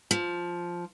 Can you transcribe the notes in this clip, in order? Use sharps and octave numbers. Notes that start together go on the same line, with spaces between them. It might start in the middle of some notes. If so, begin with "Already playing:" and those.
F3